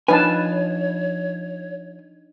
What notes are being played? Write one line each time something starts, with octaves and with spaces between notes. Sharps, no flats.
F3 D4 D#4 B4 C#5 D#5 G#5 A5